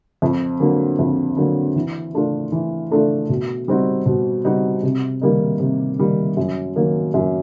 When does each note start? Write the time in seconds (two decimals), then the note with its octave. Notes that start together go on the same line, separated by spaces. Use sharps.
0.22 F2
0.60 D3 F#3 A#3
0.99 F2
1.37 D3 F#3 A#3
1.76 E3
2.14 A3 D4 F4 A4
2.52 E3
2.91 A3 D4 F4 A4
3.29 B2
3.68 G3 C4 D#4 F#4
4.06 B2
4.45 G3 C4 D#4 F#4
4.83 C3
5.21 D#3 G3 A#3 D#4
5.60 C3
5.99 D#3 G3 A#3 D#4
6.37 F#2
6.76 D#3 F#3 A#3
7.14 F#2